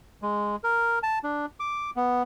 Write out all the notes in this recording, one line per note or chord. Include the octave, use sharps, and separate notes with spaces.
G#3
A#4
A5
D4
D6
B3